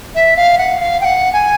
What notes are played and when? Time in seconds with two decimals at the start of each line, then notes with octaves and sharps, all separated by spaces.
0.15 E5
0.37 F5
0.58 F#5
0.80 F5
1.01 G5
1.05 F#5
1.33 G#5